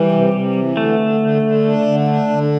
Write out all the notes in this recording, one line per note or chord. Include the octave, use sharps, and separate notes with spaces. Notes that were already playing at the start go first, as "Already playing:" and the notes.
Already playing: E3 G3
C3
C3
E3
D3 A3
D3
D3
D3
D4
D3
D4
D3